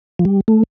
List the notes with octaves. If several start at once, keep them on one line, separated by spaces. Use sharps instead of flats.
F3
G3
A3